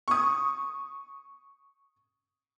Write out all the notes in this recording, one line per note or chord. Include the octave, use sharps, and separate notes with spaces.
C#6 D#6